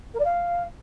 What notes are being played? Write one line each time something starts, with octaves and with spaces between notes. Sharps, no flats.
A#4
D5
F5